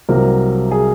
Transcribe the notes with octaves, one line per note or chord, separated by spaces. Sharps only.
C2 C3 F#3 A#3 A#4
G#4